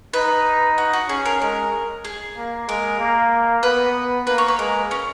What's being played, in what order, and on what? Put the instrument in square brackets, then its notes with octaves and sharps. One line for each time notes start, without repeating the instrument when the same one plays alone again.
[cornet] D#4 [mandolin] B4
[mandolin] F#4
F#4
[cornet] C#4 [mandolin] G#4
[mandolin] A#4
[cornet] G#3 [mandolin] A#4
[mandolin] G#4
[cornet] A#3
[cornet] G#3 [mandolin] A#4
[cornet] A#3
[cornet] B3 [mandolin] B4
[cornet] A#3 [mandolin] B4
[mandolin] C#5
B4
[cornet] G#3 [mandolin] A#4
[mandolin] C#4